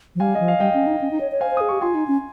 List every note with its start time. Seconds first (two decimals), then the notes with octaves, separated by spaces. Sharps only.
0.15 F3
0.20 G3 F5 G#5
0.35 D#5
0.40 F3
0.48 F5
0.60 G3 D#5 G5
0.74 C#4
0.87 D#4
1.01 C#4
1.11 D#4
1.21 C#5
1.32 C#5
1.40 C5 F5 G#5
1.51 C5
1.57 G#4 D#6
1.69 G4 C#6
1.81 F4 G#5 C6
1.94 D#4
2.08 C#4